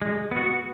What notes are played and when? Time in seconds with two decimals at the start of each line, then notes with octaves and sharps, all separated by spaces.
0.02 G#3
0.31 B3 F#4